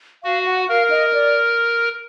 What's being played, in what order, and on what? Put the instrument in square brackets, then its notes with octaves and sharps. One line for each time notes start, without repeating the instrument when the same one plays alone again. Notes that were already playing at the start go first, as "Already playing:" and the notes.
[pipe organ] F#4 [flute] F5
[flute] F#5
[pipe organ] A#4 [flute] F5
[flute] D#5
D5